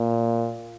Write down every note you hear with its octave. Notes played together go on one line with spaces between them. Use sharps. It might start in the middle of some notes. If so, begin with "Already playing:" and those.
Already playing: A#2